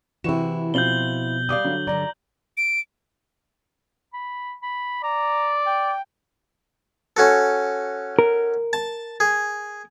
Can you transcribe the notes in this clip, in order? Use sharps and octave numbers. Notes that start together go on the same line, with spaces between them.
C3 E3 E4 F#4 C#6 E7
B2 F3 C4 F4 G6 F#7 G7
G3 D5 F5 D6 D#6
D3 F#3
G2 D3 F#3 D5 A#5
D7
B5
B5
D5 A#5
G5
C#4 F#4 A4
A#4
A5
G#4